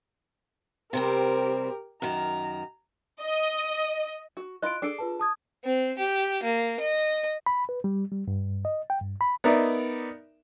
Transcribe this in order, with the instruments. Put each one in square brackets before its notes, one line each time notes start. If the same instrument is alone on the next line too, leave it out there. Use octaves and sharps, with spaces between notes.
[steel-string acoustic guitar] C3 G3 C4 [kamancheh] G4 A#4
[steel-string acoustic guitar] F#2 D#3 [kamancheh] A#5
[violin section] D#5
[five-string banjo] F#4
[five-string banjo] E4 F4 D#5 [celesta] F#6 D7
[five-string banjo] D4 G#4 A4 [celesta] D6 C7 D7
[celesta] F4 B4 A5
A5 D#6 G#6
[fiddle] C4
G4
A#3
D#5
[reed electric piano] B5
B4
G3
G3
G2
D#5
G5
G2
B5
[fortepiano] B3 D#4 A#4 D5 E5